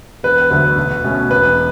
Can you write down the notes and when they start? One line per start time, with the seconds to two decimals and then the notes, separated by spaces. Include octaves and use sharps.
0.23 E1 B4
0.50 D2 D3 F#3 A3 B4
0.77 B1
1.04 B2 A3 C#4
1.30 E1 B4